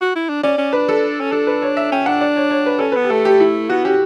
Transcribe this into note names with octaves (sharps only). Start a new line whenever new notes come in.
F#4
E4
D4
C#4 D5
C#4
D4 B4
A4
C#4
D4 A4
B4
C#5
E5
C#4 G5
D4 F#5
D5
C#5
C#5
B4
C#4 A4
B3 B4
G4
A3 A4
G4
E4
B3 F#4
C#4 G4